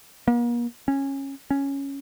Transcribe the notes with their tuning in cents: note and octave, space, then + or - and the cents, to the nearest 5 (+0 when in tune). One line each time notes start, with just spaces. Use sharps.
A#3 +40
C#4 -15
C#4 +0